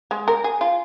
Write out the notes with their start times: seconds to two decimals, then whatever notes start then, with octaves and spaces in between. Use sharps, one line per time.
0.11 G#3
0.28 A#4
0.44 G#4
0.61 F4